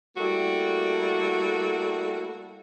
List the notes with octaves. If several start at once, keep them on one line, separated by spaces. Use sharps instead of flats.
G3 A3 A#3 E4 F#4